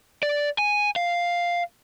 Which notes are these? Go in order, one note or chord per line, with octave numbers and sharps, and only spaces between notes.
D5
G#5
F5